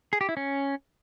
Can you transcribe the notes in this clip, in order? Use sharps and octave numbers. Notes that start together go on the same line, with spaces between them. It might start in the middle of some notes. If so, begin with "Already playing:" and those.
G#4
G4
E4
C#4